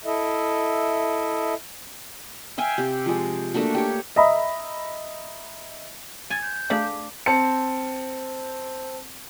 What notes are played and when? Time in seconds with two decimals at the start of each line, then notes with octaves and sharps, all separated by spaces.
0.05 E4 A4 D#5 E5
2.58 E5 F5 G5 G#5
2.78 C3 G4
3.06 F3 G#3
3.54 A3 A#3 D4 F#4
3.75 G4 C#5
4.16 D#5 E5 A#5 B5
6.30 G#5 A6
6.42 G6
6.70 A3 D4 G#4 F5
7.26 C4 C5 A5 C#7